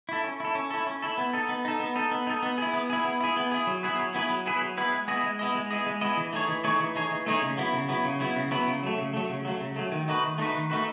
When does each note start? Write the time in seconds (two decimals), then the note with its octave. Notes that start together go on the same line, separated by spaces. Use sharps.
0.09 E4 A4
0.24 C#4
0.40 E4 A4
0.55 C#4
0.70 E4 A4
0.87 C#4
1.02 E4 A4
1.18 B3
1.33 D#4 A4
1.49 B3
1.65 D#4 A4
1.80 B3
1.96 D#4 A4
2.11 B3
2.27 D#4 A4
2.43 B3
2.58 E4 G#4
2.73 B3
2.90 E4 G#4
3.05 B3
3.21 E4 G#4
3.37 B3
3.52 E4 G#4
3.67 F#3
3.83 B3 E4 G#4 B4
3.99 F#3
4.14 B3 E4 G#4 B4
4.30 F#3
4.46 B3 E4 G#4 B4
4.61 F#3
4.77 B3 E4 G#4 B4
4.93 G#3
5.08 B3 E4 G#4 D#5
5.23 G#3
5.39 B3 E4 G#4 D#5
5.55 G#3
5.71 B3 E4 G#4 D#5
5.86 G#3
6.01 B3 E4 G#4 D#5
6.17 E3
6.33 A3 D#4 G#4 C#5
6.49 E3
6.64 A3 D#4 G#4 C#5
6.80 E3
6.95 A3 D#4 G#4 C#5
7.11 E3
7.26 A3 D#4 G#4 C#5
7.42 C#3
7.57 F#3 B3 E4
7.73 C#3
7.89 F#3 B3 E4
8.05 C#3
8.20 F#3 B3 E4
8.36 C#3
8.51 F#3 B3 E4
8.67 C#3
8.83 F#3 A3
8.98 C#3
9.13 F#3 A3
9.30 C#3
9.45 F#3 A3
9.60 C#3
9.76 F#3 A3
9.92 D#3
10.08 A3 D#4 F#4 B4
10.24 D#3
10.38 A3 D#4 F#4 B4
10.54 D#3
10.70 A3 D#4 F#4 B4